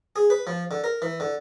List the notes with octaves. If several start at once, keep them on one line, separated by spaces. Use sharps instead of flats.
G#4
B4
F3
D3
A#4
E3
D3